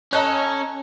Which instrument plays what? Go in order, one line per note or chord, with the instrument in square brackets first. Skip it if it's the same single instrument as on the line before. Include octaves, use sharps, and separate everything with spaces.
[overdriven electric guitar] C#4 [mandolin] A4 F#6 [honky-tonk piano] C#5 D#5 A#5